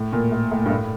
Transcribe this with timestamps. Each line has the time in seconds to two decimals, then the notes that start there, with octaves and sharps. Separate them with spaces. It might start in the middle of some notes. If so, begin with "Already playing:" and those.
Already playing: A2
0.13 A#2
0.32 A2
0.52 A2
0.66 G2
0.70 A2